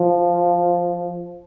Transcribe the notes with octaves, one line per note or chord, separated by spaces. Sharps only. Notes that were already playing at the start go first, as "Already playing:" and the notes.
Already playing: F3